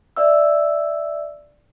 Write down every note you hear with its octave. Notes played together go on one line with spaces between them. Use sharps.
D5 E5 E6